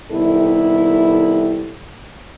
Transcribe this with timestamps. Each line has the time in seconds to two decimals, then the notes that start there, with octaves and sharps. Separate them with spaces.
0.11 C3 D#3 G3 B3 E4 A4